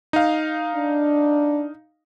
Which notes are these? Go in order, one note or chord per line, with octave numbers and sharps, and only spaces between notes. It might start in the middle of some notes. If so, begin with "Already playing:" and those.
D#4 F5
D4